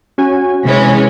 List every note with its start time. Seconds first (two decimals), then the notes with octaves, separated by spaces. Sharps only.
0.18 C#4 F#4 G#5
0.65 C3 E3 G#3 C#4